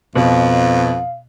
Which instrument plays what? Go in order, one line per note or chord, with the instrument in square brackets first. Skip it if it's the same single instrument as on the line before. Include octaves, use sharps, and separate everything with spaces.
[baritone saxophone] F2 [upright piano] B2 [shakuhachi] F5